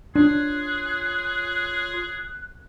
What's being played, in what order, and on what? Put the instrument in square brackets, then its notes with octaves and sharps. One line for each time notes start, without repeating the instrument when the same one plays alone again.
[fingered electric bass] D4 [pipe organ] F4 C#5 [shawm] G#4 [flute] F#6